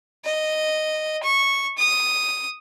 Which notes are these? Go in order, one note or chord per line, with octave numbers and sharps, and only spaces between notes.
D#5
C#6
D#6